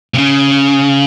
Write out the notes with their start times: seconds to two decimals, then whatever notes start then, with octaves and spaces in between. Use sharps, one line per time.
0.14 C3
0.18 C#3